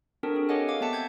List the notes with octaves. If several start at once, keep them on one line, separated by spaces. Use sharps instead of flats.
C4 D4 F#4 A4 A#4
G#4
G4 A4 C#5 D#5 F#5 G#5
F5 D6
B3 C4 E5 A5 C#7
G6 G#6